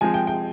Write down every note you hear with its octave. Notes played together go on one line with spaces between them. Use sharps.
F3 G#3 C4 G#5
G5
G5